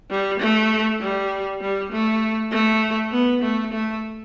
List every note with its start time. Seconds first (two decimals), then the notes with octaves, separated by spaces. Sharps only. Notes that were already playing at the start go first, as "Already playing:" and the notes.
0.10 G3
0.40 A3
1.00 G3
1.61 G3
1.92 A3
2.51 A3
3.12 B3
3.43 A3
3.73 A3